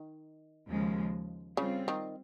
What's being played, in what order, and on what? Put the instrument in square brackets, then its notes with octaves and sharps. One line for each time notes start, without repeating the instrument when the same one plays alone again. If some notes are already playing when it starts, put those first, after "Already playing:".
Already playing: [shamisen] D#3
[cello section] D#2 C#3 F3 G#3
[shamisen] C#3 [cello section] G3 C4 F4
[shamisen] D#3